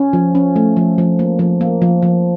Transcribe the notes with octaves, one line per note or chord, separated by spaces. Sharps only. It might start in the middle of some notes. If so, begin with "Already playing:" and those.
Already playing: C#4
F3
C#4
A3
F3
F3
A#3
F3
A#3
F3
F3